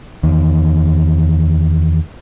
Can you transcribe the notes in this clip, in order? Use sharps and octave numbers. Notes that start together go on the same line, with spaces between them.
E2 D#3